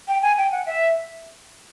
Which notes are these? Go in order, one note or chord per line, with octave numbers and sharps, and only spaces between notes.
G5
G#5
G5
F#5
E5